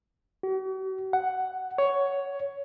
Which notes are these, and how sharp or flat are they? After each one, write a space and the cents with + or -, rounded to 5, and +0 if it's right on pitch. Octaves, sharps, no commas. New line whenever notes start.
F#4 +45
F#5 +5
C#5 +10